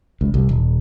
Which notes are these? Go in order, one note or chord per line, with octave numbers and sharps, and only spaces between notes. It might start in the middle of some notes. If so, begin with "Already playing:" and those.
C#2
C2
D#1